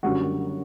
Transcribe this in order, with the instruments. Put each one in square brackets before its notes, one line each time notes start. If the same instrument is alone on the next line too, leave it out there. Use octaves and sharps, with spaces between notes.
[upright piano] F#1 F#2 D3 G3 F#4